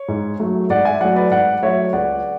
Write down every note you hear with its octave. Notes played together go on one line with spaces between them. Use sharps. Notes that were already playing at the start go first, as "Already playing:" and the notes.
Already playing: C#5
G#2
F#3 A3
G#2 D5 F#5
E5 G#5
F#3 A3 D5 F#5
B4 D5
G#2 D5 F#5
F#3 A3 C#5 E5
C#2 D5 F#5